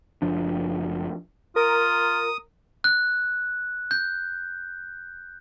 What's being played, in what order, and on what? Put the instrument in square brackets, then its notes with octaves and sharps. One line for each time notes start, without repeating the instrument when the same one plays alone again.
[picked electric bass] F#1 F3 D4
[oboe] F4 [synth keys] A#4 [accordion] D#6
[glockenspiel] F#6
G6